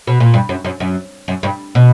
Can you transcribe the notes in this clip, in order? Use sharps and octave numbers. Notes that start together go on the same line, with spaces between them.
B2
A#2
G2
F#2
F#2
F#2
F#2
G2
B2